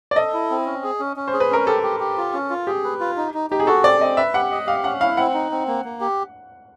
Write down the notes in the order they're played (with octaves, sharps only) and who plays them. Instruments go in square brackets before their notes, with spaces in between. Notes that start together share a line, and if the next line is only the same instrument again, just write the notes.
[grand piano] D5
[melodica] A4 [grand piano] D#5
[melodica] E4
C4
C#4
G#4
C#4
C#4
[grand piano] C5
[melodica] G#4
[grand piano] B4
[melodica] C#4 [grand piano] A#4
[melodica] G4 [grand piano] A4
[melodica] G4
G4
F4
C#4
F4
[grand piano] G4 [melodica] G#4
[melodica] B4
F4
D#4
D#4
[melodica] D#4 [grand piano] G4
[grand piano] G#4
[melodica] F#4 [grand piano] A4
[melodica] C4 [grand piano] D5
[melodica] C4 [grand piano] D#5
[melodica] B4 [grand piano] E5
[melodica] G4 [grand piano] F#5
[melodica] D#5
[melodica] G4 [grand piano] F5
[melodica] C#4 [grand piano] F#5
[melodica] E4 [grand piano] F5
[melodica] C4 [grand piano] F#5
[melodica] D#4
C4
A#3
A#3
G4